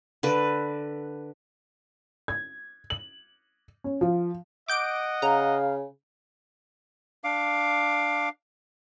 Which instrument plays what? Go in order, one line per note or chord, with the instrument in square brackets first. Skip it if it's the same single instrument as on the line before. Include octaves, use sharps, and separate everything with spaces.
[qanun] D3 B4
[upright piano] G#6
F#7
C#4
F3
[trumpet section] D#5 F#5 [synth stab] D6 G6 D7
[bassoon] C#3 [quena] F5 [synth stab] A#5
[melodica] D4 F5 D6